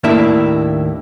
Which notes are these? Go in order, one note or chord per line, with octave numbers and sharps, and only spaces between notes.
D#2 A2 A#3 D4 E4 E5